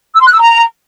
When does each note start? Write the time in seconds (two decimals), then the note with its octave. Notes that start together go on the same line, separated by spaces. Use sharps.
0.14 E6
0.20 C6
0.26 F#6
0.32 E6
0.38 A#5